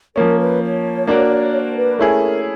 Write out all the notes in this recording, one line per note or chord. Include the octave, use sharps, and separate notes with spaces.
F3 A#3 C#4 A#4
B4
C#5
A#3 D4 F#4 A#4
C5
B4
A3 C#4 E4 G#4 A#4